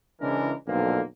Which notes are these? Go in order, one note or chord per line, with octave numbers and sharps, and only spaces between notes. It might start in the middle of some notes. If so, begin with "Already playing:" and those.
C#3 E3 G#3 D4 E4 A#4
B1 F2 A#2 D3 A#3